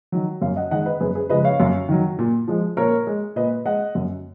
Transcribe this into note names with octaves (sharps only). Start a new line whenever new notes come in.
D#3 F#3
F#2 C#5 F5
D#5 F#5
D#3 G#3 D#5 F#5
B4 D#5
F#2 G#4 B4
G#4 B4
C#3 F3 G#3 B4 D#5
C#5 F5
F#2
D#3 F#3
A#2
F3 G#3
A#2 A#4 C#5
G#3
A#2 B4 D#5
G#3 D#5 F#5
F#2